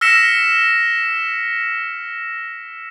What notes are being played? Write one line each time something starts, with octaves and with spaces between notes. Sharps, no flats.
E6 F6 A#6 B6 C#7 E7